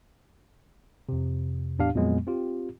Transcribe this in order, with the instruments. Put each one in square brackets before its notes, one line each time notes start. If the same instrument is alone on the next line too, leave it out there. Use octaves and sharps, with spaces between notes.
[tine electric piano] F2 C3
E2 A2 D4 G4 F5
F2 A#2 F#3 G#3 B3
C4 F4 G4